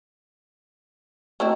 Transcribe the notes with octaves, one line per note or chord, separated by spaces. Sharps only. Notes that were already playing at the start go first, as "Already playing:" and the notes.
A3 C4 E4 F#4 D#5 A#5